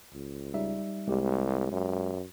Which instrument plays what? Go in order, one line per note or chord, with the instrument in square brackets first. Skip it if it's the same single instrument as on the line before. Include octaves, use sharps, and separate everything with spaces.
[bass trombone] C#2
[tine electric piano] G3 D#4 E5
[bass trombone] C2 [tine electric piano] G#3 G4
[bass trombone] F#2